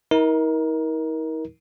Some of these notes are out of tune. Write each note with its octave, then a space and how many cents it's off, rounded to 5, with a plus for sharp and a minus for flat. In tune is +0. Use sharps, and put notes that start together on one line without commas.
D#4 +45 A#4 +20